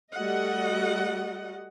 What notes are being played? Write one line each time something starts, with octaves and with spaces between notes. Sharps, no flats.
G3 A3 F#4 D#5 F#5